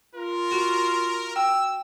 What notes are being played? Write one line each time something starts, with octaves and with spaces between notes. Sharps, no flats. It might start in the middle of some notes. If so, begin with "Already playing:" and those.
F4 A#4
F#4
G5 E6